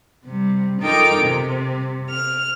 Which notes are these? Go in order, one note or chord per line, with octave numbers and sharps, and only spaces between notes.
C3 G3
D#4 F4 A4 A#4 G5 D6
C3
F6